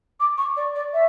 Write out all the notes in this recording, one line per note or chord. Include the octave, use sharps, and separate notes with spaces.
D6
C#6
D5
D5
E5